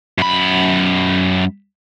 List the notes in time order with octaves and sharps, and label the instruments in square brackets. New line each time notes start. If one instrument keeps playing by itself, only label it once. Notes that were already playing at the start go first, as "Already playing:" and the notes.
[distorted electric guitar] F#2 B5